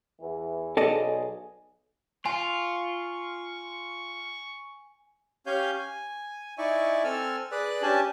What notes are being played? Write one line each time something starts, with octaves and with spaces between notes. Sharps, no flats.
E2 E3
B1 G#4 A4 D5 D#5
F4 G#5 C#6
C#4 G4 C#5 F5 G#5 G6
G#5
D#4 E4 D5 E5 G#5 C#6
C4 A4 G#5 E6 F6
G#4 B4 D5 B5 F#6
C#4 D4 G4 G#5 A5